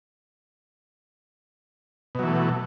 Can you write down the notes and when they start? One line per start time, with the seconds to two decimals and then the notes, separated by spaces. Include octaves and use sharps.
2.15 B2
2.19 F#3
2.23 E3
2.27 A3